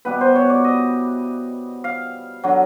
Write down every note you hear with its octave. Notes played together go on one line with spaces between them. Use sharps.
B2 G3 B3 E4 B4
C5
C#5
D5
D#5
F5
D3 F#3